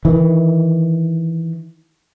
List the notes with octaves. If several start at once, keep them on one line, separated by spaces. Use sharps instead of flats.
D#3 E3